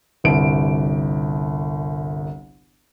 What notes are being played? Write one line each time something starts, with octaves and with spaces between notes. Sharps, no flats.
G1 C2 D7